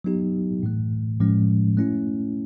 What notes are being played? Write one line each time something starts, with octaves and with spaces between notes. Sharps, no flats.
F#3 B3 D#4 G4
A2 E3 A3
A2 F3 G#3 C#4
A3 C#4 E4